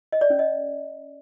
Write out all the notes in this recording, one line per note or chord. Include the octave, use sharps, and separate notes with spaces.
D#5
D5
C#4
D#5